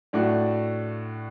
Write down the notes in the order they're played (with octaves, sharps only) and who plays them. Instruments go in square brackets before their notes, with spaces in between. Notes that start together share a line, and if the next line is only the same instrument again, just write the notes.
[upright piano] A2 A3 D4 F#4